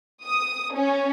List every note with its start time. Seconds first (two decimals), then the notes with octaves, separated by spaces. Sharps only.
0.24 D#6
0.74 C#4